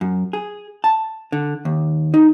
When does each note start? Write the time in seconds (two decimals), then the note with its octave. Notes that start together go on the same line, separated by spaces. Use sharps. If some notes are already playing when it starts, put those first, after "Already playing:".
0.01 F#2
0.33 G#4
0.84 A5
1.32 D3
1.65 D#2
2.14 D#4